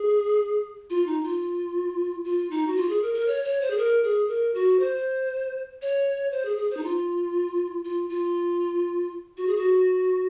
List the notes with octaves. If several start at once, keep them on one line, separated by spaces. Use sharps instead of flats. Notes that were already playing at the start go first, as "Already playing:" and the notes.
Already playing: G#4
F4
D#4
F4
F4
D#4
F#4
F4
G#4
A#4
A#4
C#5
C#5
C5
G#4
A#4
G#4
A#4
F#4
C5
C#5
C5
G#4
G#4
C5
D#4
F4
F4
F4
F#4
G#4
F#4